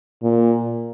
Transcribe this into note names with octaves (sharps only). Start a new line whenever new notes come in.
A#2